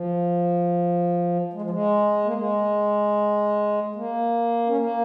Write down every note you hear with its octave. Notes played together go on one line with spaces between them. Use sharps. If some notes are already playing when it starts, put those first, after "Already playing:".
Already playing: F3
G#3
F3
G#3
A#3
G#3
A#3
C#4
A#3